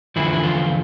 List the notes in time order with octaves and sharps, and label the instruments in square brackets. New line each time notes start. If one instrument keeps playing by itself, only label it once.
[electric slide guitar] E2 D3 F3 E4
E4
F4